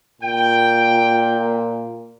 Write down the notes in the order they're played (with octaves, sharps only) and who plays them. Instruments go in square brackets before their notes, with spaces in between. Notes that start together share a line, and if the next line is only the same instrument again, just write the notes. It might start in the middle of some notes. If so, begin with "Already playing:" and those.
[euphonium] A#2 [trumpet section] G5